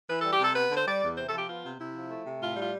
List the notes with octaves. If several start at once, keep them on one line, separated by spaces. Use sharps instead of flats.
E3 B4
G3 A4
G4
C3 A4
B3 B4
D3 C5
G3 D5
E2
C3 C5
A4
F3
G4
B3 F4
C3
C3 E4
F3
A3
C3
A2 F4
G3 F4